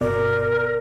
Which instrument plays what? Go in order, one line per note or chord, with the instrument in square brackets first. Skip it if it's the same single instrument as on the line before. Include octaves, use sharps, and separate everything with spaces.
[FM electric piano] G1 B2 D5 [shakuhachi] A#4